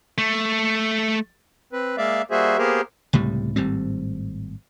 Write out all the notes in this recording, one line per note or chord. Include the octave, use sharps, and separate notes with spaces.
A3
C4 B4
G#3 A#3 D5 E5 F5
G3 A#3 F#4 G#4 C5 E5
A#3 B3 G4 G#4 A#4 C5
C#2 A2 C3 G3
G#1 A2 G3 C4